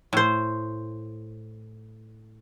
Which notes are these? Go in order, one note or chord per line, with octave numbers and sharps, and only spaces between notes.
A2 C5